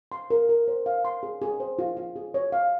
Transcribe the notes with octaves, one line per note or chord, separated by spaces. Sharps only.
C6
A#4
A#4
C5
F5
C6
G#4
G#4
C5
F4
F4
G#4
C#5
F5